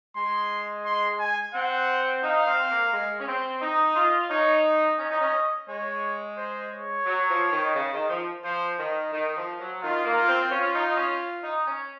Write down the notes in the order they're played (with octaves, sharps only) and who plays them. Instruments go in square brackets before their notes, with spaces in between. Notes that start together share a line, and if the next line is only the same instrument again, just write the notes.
[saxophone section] G#3 [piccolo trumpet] C6
[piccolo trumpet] C6
G#5
[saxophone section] C4 [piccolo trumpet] F#5
[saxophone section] D#4 [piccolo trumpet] F5
[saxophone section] C4
A#3
G#3
C#4
C4
[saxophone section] D#4 [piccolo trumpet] D#5
[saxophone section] F4
[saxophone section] D#4 [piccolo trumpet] C#5
[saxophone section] C#4 [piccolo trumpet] D#5
[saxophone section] D#4
C#4
[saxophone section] G#3 [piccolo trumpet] C#5
[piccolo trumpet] C5
C#5
[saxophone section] F#3
F3
D#3
C#3
D#3
F3
[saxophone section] F3 [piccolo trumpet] C5
[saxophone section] D#3
D#3
F3
F#3
[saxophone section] D#3 [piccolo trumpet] F4
[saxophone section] A#3
[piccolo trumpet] F4
[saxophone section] C4
[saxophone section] C#4 [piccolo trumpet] F4
[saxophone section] D#4
C#4
D#4
C#4